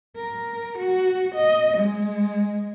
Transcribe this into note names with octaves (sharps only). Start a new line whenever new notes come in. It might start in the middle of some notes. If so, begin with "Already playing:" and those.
A#4
F#4
D#5
G#3